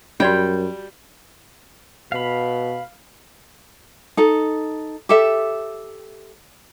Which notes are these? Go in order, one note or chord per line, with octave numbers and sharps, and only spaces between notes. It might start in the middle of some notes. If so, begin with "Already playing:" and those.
F#2 G3 F#4 D5 G5 B5
B2 F5 B5
D#4 A4
G4 A4 E5